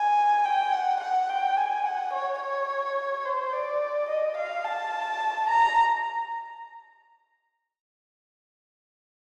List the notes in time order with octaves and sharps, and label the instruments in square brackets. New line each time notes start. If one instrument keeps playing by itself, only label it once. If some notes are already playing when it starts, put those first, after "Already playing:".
Already playing: [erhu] G#5
G5
F#5
F#5
G5
G#5
F#5
C#5
C#5
C5
D5
D#5
F5
A5
A#5